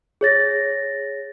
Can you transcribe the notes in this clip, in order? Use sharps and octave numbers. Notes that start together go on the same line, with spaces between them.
G#4 C#5 A6 A#6